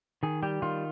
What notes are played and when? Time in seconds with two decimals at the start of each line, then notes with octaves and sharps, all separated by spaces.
0.23 D#3 G#4
0.43 G3 G4
0.62 D#3 F4